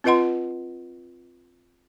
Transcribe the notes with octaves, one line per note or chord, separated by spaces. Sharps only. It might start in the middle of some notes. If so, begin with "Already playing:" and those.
C4 F4 B4 D#5 F#5 C6